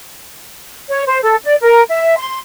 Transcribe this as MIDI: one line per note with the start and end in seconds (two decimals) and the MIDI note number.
0.89 1.04 73
1.06 1.19 72
1.23 1.36 69
1.44 1.56 74
1.62 1.83 70
1.90 2.15 76
2.18 2.39 84